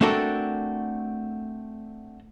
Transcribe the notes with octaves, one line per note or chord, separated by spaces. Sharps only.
A3 C4 D4 F#4 A4 A#4